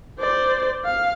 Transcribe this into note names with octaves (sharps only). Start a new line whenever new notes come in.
C5 D5
F5